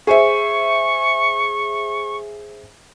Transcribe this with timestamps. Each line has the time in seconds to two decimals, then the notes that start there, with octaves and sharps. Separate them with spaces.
0.07 G#4 C5 E5 C#6